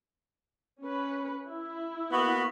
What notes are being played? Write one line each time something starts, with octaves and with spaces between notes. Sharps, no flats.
C#4 B4
E4
A#3 B3 F#4 B5